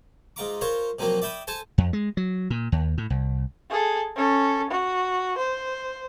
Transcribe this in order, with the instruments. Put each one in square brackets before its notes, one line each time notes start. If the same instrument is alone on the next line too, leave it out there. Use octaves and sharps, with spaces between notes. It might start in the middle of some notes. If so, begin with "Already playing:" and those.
[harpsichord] G#2 F4 A#5 D6
F4 A#4 C5 C#5 F5
C3 F3 F#3 A#3 C4
D5 E5 G5 B5 D#6
A4 C5 G#5 A5
[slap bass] F2
G#3
F#3
A#2
D#2
A2
C2
[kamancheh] G#4 A4
C#4 A4
F#4
C5